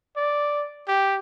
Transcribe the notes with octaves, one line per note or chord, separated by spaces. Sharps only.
D5
G4